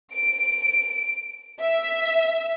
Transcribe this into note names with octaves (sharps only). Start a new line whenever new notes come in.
D7
E5